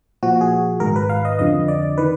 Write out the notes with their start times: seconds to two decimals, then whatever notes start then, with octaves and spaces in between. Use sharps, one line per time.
0.23 A#2 F3 F#4
0.41 G#4
0.80 G#2 D#3 A#4
0.96 B4
1.09 F5
1.25 D#5
1.39 F2 D3 F3 D#5
1.68 D5
1.98 D#3 B4